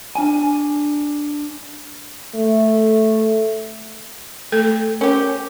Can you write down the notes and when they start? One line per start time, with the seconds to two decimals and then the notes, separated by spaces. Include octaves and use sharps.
0.15 D4 G#5
2.35 A3
4.52 A3 A4
5.01 C#4 G4 A#4 C5 C#5